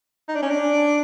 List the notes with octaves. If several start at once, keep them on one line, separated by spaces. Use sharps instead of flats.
D#4
D4
C#4
D4